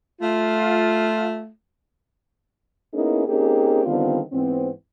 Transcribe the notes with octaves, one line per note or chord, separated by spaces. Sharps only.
A3 F4
A#3 B3 C#4 D#4 E4 G#4
A#3 C4 C#4 D#4 G4 G#4
D3 D#3 G3 B3 C4 F4
G#2 E3 B3 C4